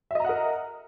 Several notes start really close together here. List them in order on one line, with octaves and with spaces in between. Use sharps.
E5 D#5 A#5 F#5 A#4